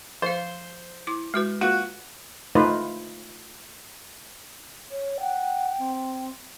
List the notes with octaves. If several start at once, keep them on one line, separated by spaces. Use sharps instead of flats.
F3 C5 F5
E4 D6
G#3 F#4 B4
A#3 F4 F#4 B4
A3 D#4 F4 B4 C5
C#5
F#5 G5
C4